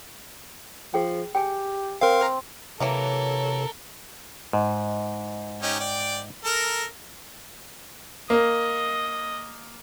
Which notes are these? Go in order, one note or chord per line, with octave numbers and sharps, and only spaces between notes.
F3 G#4 G5
G4 G5 G#5
C4 A#4 F5
C3 E3 F#3 A#3 A4 A#4 C#5
G#2
C#4 D#4 G4
D5 G5
A4 A#4 A#5
A#3 D#5